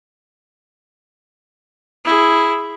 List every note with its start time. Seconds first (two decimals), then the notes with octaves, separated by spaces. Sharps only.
2.05 E4 G#4